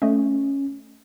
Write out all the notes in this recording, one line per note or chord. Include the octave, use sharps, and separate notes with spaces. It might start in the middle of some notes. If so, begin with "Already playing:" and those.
A3 C#4 D#5